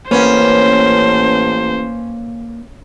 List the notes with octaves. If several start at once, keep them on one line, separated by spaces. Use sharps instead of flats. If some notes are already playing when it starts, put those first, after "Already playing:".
A1 A#3 C#4 B4 C5